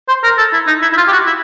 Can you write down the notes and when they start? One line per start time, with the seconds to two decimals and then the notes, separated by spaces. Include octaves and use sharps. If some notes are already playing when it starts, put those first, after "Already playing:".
0.08 C5
0.23 A#4
0.38 A4
0.53 E4
0.67 D#4
0.82 E4
0.93 E4
0.97 F4
1.08 G4
1.12 F#4
1.26 E4